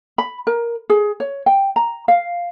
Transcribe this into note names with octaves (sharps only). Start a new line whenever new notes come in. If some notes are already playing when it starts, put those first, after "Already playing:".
B5
A#4
G#4
C#5
G5
A#5
F5